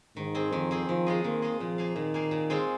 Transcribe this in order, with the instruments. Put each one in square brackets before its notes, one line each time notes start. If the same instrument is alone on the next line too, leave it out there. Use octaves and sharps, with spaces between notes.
[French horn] G#2 [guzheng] D#3
[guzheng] C4 G#4
[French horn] F2 [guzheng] D#3
[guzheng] C4 G#4
[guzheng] D#3 [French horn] F3
[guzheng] G#3 F4 G#4 D#5
[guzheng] D#3 [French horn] A#3
[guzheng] G#3 F4 G#4 D#5
[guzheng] A#2 [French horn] F3
[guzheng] A#3 G#4 F5
[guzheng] A#2 [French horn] D#3
[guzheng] A#3 G#4 F5
A#2
G#3 C4 F4 G#4